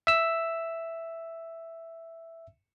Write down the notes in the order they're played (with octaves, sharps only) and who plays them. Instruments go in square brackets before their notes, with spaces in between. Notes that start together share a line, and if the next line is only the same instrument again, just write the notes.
[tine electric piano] E5 E6